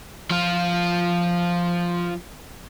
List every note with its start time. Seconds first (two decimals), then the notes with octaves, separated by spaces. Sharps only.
0.31 F3 F4